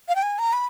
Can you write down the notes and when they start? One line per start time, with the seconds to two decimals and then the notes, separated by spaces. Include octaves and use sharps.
0.09 F5
0.16 G5
0.23 G#5
0.39 A#5
0.53 B5